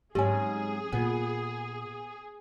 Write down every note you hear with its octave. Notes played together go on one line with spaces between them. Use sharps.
G#2 F#3 C4 C#4 G4 G#4 G#5
A#2 B3